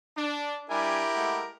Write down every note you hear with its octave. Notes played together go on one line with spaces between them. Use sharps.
D4
G3 D4 E4 G4 A#4 G#5
G#3 A3 F#5